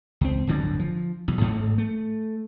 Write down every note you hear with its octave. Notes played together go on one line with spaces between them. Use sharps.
C#2 C4
D1 G1 F#2 D3
F3
B1 E2
A1 G#2 A3
A3